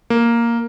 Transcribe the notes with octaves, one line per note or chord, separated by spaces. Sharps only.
A#3